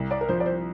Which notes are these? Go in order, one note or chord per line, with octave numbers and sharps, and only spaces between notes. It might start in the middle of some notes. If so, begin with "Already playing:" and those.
Already playing: C2
D5
A#4
F3 C5
D5
C5